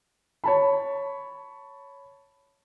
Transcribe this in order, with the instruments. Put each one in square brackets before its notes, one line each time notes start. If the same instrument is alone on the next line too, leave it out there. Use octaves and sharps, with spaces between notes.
[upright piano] C#5 A5 B5